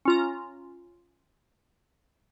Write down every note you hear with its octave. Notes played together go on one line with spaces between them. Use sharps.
C#4 F4 A#5